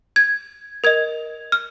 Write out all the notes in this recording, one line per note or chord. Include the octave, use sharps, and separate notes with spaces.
G#6
A#4 D#5 G#6
F6